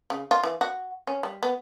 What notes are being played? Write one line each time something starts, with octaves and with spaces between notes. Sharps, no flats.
C#3
F4
E3
F#4
C#4
G3
B3